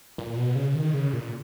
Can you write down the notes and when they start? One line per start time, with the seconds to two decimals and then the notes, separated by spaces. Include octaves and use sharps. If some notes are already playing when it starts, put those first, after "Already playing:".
0.18 A#2
0.37 B2
0.56 C#3
0.75 D#3
0.94 C#3
1.13 A#2